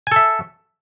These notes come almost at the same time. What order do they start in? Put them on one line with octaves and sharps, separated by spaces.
G#5 A4 E5